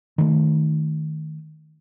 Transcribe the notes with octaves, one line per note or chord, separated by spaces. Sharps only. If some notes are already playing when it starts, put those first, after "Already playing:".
D#3 A3